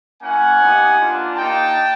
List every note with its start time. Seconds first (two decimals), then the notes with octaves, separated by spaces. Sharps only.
0.22 A#3 C#4 E4 F#5 G#5
0.59 B3 D#4 G4
0.97 A#3 D4 F4
1.35 A#3 D#4 G4 G5 A5